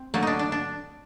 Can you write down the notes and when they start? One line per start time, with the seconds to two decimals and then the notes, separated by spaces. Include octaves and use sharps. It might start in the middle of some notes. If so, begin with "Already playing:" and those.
Already playing: C4
0.14 D3 F#3 A3 A#3
0.23 D4 D#4
0.39 D4
0.52 D4